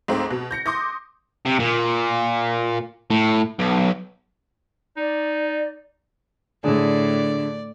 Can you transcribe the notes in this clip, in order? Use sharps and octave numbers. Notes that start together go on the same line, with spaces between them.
C#2 G#2 A3 C4
B2
G6 A#6 C#7
C6 D6 D#6 G6 A#6
C3
A#2
A2
B1
D#4 D5
A2 D3 G#4 D5